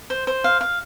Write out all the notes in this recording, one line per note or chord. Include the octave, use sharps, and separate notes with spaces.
C5
C5
F5
F5